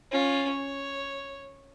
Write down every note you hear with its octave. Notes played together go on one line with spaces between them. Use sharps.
C#4 F4
C#5